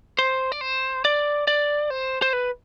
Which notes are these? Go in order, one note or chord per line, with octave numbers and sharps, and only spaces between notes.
C5
D5
C5
D5
D5
C5
C5
B4